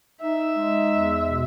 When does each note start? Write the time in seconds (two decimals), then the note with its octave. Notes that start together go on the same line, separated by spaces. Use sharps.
0.21 D#4 E5
0.56 G#3
0.91 E2
1.27 B2